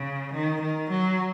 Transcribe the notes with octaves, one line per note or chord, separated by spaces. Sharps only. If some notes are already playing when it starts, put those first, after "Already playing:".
Already playing: C#3
D#3
D#3
F#3